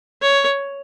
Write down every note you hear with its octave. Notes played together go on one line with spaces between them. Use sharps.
C#5